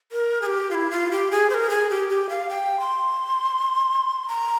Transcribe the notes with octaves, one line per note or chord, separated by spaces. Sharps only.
A#4
G#4
G4
F4
E4
F4
G4
G#4
C5
A#4
G#4
G4
G4
F5
G5
C6
A#5